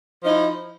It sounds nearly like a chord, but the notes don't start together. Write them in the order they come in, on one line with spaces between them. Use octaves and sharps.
F3 D#4 E4